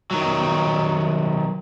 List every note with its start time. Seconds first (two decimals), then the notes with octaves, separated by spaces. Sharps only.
0.11 D#3 F#3